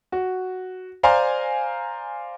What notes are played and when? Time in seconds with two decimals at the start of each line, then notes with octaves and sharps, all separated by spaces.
0.12 F#4
1.03 C5 D5 F5 G#5 A#5